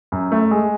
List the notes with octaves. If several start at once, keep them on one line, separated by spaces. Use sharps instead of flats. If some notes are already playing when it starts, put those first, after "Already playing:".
F#2
A3
G#3